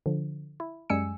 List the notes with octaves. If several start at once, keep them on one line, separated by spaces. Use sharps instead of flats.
D3 F3
E4
F#2 G3 G#3 G#5 E6 C#7